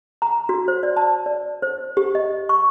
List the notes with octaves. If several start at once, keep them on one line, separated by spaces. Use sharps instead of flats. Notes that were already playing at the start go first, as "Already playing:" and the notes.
A#5
F#4
C5
D5
A5
D5
C5
G4
D#5
C#6